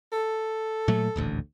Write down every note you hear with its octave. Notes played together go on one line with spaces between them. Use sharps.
A4
A#2 F#3 A3
D#1 A1 D2